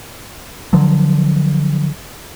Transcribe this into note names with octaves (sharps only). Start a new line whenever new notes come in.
D3 F3 F#3